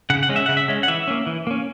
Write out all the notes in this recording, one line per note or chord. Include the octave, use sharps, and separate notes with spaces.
C#3 F#5
F#5
G#3 C#4
E5
C#3 F#5
E5
G#3 C#4
F#5
E3 E5
A#3 C#4
E3
A#3 C#4